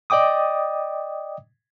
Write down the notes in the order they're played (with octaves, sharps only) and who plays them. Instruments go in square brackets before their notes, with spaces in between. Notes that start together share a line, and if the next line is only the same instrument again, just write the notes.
[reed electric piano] D5 D#5 G5 D6 D#6